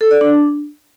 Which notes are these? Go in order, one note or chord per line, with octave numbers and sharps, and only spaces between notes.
A4
D5
D4